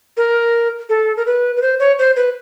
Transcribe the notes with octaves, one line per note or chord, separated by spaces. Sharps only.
A#4
A4
A#4
B4
B4
C5
C#5
C5
B4